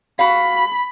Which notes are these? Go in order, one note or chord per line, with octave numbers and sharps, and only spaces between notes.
F#4 F5 B5